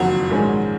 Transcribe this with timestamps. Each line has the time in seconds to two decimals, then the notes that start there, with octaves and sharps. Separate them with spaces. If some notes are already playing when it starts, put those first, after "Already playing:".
Already playing: F#1 F2 D#3 F#3 A#3
0.29 A#1 G#2 D#3 G#3 C#4